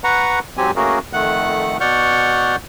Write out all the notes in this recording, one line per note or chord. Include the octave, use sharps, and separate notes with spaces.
B4 F#5 A#5 C#6
G#2 F#3 C4 G4 G#5
A3 A#3 C#4 F#4 G#4 A#4
F2 D#3 A3 F#5 F#6
B2 D5 F#5 C#6 F6 G6